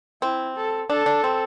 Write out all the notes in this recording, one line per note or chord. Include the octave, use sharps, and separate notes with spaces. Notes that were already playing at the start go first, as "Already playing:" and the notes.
C4 E4
A4
D4 A4
D4
C4